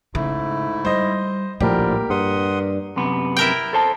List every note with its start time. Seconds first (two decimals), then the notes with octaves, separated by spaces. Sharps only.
0.15 G#2 C#3 A3 E4
0.85 G3 C5 D#5
1.60 A#1 A2 D3 F3 G3 A#3 G4 A#4
2.10 G2 F#5 C6 D#6
2.96 F#2 C3 B3
3.37 E4 A#4 G5
3.73 A4 C5 A5